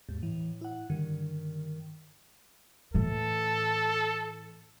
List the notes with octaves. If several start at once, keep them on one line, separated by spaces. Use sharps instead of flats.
D#2 G#2
A2 E3
E4 F#5
G2 D3 D#3
A2 E3 A4